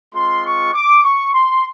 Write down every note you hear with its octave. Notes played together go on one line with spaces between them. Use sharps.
G#3 C4 F4 C6
C#6
D6
C#6
C6